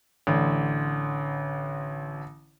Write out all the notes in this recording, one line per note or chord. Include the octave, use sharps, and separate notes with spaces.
A1 D3